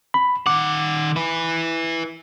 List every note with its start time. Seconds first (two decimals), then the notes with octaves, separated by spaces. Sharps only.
0.14 B5
0.47 D#3 F#5 D6
1.16 E4 B4